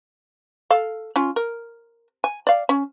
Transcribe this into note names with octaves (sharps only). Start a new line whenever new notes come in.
A4 F5
C#4 F4
A#4
G#5
D5 F5
C#4